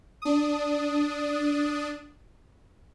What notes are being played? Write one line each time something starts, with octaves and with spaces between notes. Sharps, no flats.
D4 D#6